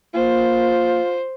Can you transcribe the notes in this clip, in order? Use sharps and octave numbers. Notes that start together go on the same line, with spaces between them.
A#3 F4 C5